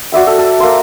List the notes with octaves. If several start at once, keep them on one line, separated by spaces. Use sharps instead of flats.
F#4 D5 E5 G5
A4
A4
A#3 C5